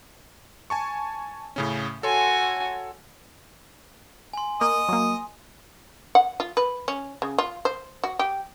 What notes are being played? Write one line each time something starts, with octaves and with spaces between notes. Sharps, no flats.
G#5 A5 C#6
A2 C#3 C#4
F#4 A4 C#5 G#5 C6
G#5 C6
A#3 D#5
F#3 A#3
F#5
F4
B4
C#4
C#3
F4
C5
F#4
G4